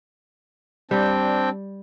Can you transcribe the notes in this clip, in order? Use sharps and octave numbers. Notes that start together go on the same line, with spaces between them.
G3 C4 D4 G5